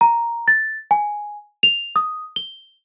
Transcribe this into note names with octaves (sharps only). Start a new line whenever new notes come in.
A#5
A6
G#5
F7
D#6
G7